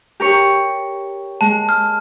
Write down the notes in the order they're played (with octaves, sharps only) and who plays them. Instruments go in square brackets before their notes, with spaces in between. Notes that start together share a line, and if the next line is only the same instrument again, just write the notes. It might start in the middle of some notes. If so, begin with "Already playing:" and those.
[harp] G4 A#4 C#5
[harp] G#3 [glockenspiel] A5
[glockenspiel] F6